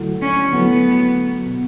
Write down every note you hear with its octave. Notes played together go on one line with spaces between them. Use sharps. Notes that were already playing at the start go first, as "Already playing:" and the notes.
Already playing: D3 F#3 A3 E4
C#4
D3 F#3 A3 B3 E4 B4
B2